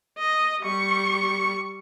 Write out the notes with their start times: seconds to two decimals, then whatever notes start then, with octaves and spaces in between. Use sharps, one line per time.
0.18 D#5
0.62 G3 C#6